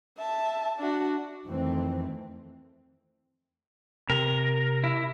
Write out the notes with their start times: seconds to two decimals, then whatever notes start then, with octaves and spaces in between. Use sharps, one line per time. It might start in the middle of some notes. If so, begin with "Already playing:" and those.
0.18 E5 A5
0.79 D4 F#4
1.46 F2 D#3 E3 A3 C4
4.10 C3 A#4
4.84 E4